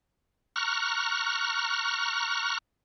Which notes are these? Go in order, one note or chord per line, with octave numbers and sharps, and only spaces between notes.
A#5 C#6 F6 F#6